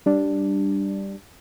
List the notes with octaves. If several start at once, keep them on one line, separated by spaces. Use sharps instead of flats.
G3 D4